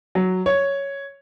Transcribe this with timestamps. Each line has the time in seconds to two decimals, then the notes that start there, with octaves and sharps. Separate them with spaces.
0.15 F#3
0.46 C#5